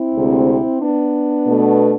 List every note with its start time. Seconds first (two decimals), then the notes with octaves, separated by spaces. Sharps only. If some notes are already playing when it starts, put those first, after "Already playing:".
Already playing: C4 E4
0.13 D2 C3 G#3
0.79 B3 D4
1.46 B2 A3